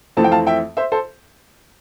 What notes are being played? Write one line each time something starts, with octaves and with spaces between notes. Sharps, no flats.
F2 E3 A3 C4 A5
G5
F5 A5
E5 G5
C5 E5
A4 C5